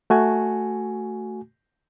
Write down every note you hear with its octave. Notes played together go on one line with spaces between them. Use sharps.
A3 F#4 G#5